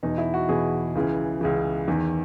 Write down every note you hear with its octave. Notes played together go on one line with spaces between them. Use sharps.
E2 B2 D#4
E4
F#4
E2 B2 G#4
C#2 C#3 E3
C#2 C#3 E3
E2 D#3